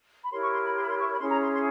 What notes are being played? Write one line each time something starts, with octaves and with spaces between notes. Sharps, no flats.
B5
E4 G4 A#4 C#5 C6
C#6
C6
B5
C6
B5
C6
C#6
B5
C#4 E4 G#4 C#5 C6
A#5
C6
C6